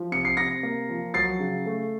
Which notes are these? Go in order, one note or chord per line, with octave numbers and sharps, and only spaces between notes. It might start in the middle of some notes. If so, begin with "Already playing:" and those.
Already playing: F3
C3 C#7
C7
C3 A#6 C#7
A#3
F3
F#3 A6 C7
C#3
A3